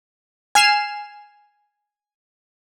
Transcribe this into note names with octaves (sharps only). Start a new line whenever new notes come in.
G#5 F6 C7 E7